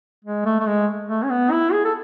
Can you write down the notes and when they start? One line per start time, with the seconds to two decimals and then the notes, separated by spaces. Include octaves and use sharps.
0.25 G#3
0.45 A3
0.59 A3
0.67 G#3
1.08 A3
1.23 C#4
1.30 B3
1.51 E4
1.72 G#4
1.85 A4